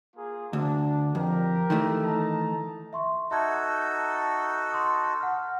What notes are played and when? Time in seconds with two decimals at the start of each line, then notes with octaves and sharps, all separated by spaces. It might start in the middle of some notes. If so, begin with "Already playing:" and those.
0.16 A#3 F4 G#4
0.53 D2 D4
1.15 F2 G4 A#4
1.70 D#3 E3 A3
2.02 D#4 A5 A#5
2.93 E5 C6 C#6
3.31 D#4 F#4 A4 E5 A5 G#6
4.72 C6 D#6
5.20 F#5 F6